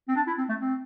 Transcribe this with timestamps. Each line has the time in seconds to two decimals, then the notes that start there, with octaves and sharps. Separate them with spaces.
0.08 C4
0.16 D4
0.27 E4
0.38 C4
0.49 A3
0.60 C4